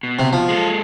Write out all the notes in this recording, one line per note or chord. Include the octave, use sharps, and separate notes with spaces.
B2
C3
F3
G#3 A4